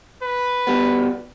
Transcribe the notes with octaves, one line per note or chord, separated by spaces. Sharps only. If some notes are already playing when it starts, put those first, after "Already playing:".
B4
B2 G3 B3